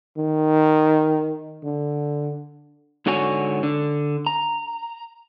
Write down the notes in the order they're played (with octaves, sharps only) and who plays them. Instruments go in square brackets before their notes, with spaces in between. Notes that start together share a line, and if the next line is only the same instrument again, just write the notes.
[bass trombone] D#3
D3
[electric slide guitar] G#2 D3 F#4 C#5 G#5
D3
A#5